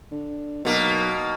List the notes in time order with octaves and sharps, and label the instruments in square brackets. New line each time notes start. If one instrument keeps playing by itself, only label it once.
[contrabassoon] D3
[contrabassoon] B1 [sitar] B2 A#3